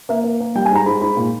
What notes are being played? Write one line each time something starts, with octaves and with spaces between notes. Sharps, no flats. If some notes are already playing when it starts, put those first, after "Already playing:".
A#3 E5
A#3
A#3
G3 G5
G#5
G#2 A#5
G#2 B5
G#2 B5
A#2